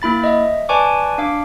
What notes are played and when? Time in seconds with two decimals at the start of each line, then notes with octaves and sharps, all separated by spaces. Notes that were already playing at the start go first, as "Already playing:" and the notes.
0.02 A#3 E4 B5 A6
0.24 D#5 E5
0.69 B4 D5 G#5 A5 C#6 D6
1.18 D4 F5 D6